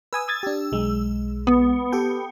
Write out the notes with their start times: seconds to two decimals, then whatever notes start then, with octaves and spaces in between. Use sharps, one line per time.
0.13 B4 G#5 D#6 E6
0.28 D#6 G#6 A6
0.43 D4 G4
0.72 B1 G#3
1.47 B3
1.92 G4 A4 G5